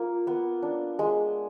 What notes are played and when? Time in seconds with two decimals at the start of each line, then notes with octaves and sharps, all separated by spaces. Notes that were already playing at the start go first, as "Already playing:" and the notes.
Already playing: A#3 F4
0.27 B3
0.63 D4
0.99 G#3